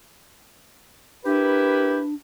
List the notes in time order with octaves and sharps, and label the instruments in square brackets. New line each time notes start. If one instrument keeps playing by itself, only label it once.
[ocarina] D4 [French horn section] E4 A#4 B4 [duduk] G4